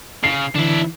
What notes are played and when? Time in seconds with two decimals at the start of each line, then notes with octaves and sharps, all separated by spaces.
0.24 C#3 C7
0.55 D3 E3 D4 E4